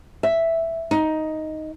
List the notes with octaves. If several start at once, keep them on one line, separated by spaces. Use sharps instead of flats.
E5
D#4